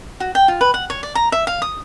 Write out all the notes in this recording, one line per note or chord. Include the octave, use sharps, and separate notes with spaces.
F#4
G5
F4
B4
F#5
C#5
D5
A#5
E5
F5
D#6